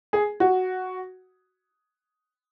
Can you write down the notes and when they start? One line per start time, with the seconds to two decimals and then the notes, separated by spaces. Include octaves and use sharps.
0.13 G#4
0.40 F#4